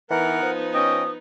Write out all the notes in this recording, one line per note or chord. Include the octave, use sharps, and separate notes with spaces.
E3 B3 D#4 A#4 F#5
F3
C#4 D#5 G5 D#6